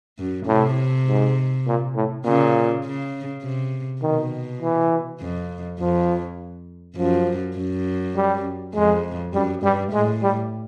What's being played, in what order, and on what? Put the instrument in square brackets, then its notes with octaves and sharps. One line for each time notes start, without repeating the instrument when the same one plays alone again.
[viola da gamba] F#2
[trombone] A2 [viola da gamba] C3
[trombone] G#2
A#2
A2
[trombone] A#2 [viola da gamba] C#3
[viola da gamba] C#3
C3
[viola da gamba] B2 [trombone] D#3
[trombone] E3
[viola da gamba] F2
[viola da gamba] F2 [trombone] F3
[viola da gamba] F#2 [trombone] F3
[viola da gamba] F#2
[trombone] G3
[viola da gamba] F2 [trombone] G#3
[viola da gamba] F#2 [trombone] G3
[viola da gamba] G2 [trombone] G3
[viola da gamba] A2 [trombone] G#3
[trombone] G3